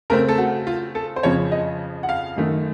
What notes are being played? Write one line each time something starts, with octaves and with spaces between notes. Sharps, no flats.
C#3 A3 C4 A#4
A4
F#4
F4
A4
C5
F2 C#3 F3 C#5
D#5
F#5
F5
F#2 D#3 A3